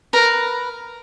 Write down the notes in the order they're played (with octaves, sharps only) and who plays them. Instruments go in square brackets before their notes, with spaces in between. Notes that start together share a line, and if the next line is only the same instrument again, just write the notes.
[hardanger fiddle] A#4 [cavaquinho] B4